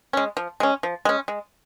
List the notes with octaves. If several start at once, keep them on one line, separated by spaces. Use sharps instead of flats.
G#3 C#4
F3
G#3 C#4
F3
G#3 C#4
G#3